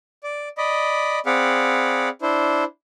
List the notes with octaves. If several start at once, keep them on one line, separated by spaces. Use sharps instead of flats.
D5
D5 D#5 B5
C4 G#4 D5 F5 F#5 B5
D4 E4 C5